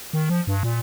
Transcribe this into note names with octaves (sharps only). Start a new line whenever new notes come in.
D#3
F3
G2
A#2